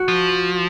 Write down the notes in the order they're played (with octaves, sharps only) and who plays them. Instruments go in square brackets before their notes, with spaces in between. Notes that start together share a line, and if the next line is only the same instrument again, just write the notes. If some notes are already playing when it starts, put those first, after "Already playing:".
Already playing: [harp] F#4
[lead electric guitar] F3